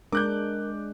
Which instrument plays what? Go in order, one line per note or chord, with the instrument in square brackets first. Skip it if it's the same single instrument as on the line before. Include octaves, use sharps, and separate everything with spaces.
[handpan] G#3 D4 [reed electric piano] A#4 [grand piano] D6 F#6 G6